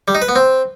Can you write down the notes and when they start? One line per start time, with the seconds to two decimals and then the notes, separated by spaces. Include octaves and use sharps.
0.08 G3
0.15 D#4
0.22 B4
0.29 B3
0.36 C4